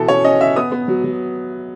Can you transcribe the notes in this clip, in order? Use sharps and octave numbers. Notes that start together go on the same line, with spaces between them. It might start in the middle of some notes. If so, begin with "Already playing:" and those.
Already playing: B2 E3 A4
C#4 C#5
C#4 D#5
C#4 E5
B3 D#6
B3
F#3
F#3